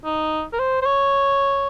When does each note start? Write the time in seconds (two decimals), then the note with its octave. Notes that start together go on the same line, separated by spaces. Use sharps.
0.05 D#4
0.53 A#4
0.59 C5
0.82 C5
0.86 C#5